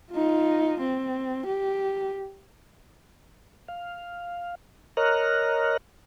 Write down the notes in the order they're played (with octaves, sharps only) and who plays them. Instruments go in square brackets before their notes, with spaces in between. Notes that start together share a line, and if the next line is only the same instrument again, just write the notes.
[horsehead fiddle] D#4 F4
C4
G4
[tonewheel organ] F5
A#4 C#5 D#5 A#5 F6 F#6